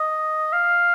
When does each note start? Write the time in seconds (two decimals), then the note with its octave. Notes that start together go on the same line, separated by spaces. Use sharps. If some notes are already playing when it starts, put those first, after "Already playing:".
Already playing: D#5
0.53 F5